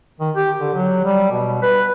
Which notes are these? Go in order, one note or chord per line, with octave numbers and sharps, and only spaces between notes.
D#3
G4
D3
F#3
G3
B2
B4